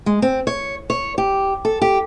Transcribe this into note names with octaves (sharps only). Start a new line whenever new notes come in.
G#3
C4
C#5
C#5
G4
A4
G4